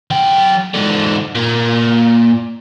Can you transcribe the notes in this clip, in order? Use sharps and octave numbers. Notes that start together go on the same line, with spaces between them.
F#3 G5
G#2 D3
A#2